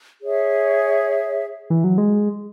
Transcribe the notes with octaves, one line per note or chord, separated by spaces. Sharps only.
G#4 C#5 E5
E3
F#3
G#3